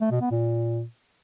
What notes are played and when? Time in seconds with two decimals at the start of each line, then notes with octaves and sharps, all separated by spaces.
0.01 A3
0.11 B2
0.21 B3
0.31 A#2